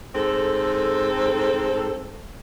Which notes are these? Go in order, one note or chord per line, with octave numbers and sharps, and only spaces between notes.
G#2 C4 A4